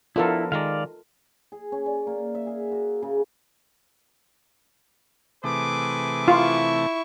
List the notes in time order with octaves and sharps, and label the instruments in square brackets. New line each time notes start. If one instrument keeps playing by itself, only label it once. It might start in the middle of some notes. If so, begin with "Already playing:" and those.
[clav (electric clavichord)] F3 B3 D4 [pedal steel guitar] E4 [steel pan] F4 A4 A#4
[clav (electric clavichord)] D#3 G#3 A#5 [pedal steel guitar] D5 F5
[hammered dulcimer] G#4
C#4
D5
A#3
E5
G#4
F#4
C#3
[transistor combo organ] C3 E3 A3 [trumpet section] G#4 B4 D6
[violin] E4 C#6 [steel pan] F4